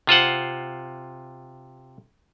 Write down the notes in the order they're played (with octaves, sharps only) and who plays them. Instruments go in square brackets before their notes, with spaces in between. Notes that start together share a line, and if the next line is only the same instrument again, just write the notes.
[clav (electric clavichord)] C3 F4 C5 F#5